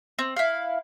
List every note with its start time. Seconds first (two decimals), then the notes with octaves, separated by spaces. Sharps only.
0.19 C4
0.37 E4 F5